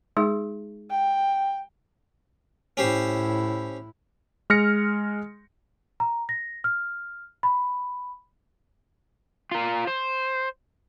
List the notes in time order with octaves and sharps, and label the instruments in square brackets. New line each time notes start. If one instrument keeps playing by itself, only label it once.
[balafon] G#3 D#4 G#4
[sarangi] G5
[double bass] A2 E4 [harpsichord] C#4 G4 C5
[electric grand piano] G#3 F6 A#6 C#7
[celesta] A#5
A#6
F6
B5
[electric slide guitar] F4 A#4
C5